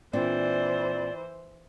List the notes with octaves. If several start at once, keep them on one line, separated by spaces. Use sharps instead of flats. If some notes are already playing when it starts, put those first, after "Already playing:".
A#2 E3 C4 D4 C5 D5